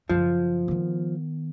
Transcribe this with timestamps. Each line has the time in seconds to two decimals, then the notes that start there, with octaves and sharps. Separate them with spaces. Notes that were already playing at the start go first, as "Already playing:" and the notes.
0.09 F#2 C#3 F3
0.68 D#3 B3